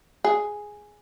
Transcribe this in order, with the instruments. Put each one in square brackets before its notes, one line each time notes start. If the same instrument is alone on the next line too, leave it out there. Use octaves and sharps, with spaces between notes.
[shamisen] G#4